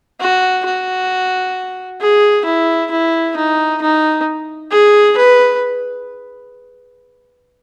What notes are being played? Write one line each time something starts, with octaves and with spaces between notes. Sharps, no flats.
F#4
F#4
G#4
E4
E4
D#4
D#4
G#4
B4